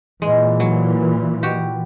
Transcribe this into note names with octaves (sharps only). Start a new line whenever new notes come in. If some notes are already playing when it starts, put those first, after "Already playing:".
A#2 E3 G#3
F#3
F#4 G4